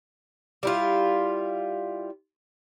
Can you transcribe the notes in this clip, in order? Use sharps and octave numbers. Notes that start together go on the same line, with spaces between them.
G3 E4 F4